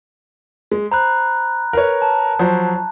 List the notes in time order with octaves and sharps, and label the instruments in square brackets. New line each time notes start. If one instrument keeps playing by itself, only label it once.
[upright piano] G#3
[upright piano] C5 [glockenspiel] A#5 B5 F#6
[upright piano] A#4 B4 C#5
[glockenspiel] A5
[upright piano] F3 F#3 C5